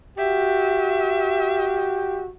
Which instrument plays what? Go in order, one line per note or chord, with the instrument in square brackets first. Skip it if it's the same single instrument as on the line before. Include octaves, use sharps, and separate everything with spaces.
[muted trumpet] F#4 [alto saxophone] G4 [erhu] E5